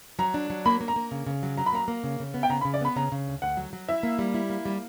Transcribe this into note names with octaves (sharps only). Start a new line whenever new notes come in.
F#3 A#5
D4
F#3
A#3 B5
A#3
A#5
A#3
C#3
C#3
F#3
F#3 A#5
B5
A#3 A#5
A#3
C#3
C#3
B3
G5
C#3 A#5
B5
C#3
D5
B3 B5
C#3 A#5
C#3
D2
D2 F#5
F#3
F#3
E4 E5
A#3
G3
E4
A#3
G3